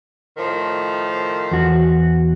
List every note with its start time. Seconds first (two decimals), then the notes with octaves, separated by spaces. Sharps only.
0.38 A2 D#3 F3
1.51 E2 F#4